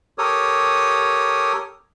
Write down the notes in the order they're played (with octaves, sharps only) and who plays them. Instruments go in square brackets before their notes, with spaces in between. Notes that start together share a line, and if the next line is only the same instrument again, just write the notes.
[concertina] G4 A4 A#4 C#5 D#6